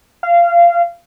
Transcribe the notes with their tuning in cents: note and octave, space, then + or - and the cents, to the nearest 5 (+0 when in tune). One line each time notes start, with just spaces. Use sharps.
F5 -20